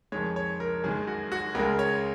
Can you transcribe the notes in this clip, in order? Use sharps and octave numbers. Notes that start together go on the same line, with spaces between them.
F2 D#3 G#3 C#5
C#5
A#4
F#2 D#3 G#3 G#4
F#4
F#4
C#2 C#3 G#3 A#4
C#5